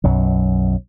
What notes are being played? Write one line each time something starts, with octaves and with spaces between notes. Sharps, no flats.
B1 F#2 F#3